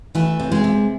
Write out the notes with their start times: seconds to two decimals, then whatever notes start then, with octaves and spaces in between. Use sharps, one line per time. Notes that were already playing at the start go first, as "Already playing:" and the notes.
0.15 E3 A3
0.40 C3
0.52 G#3
0.64 C3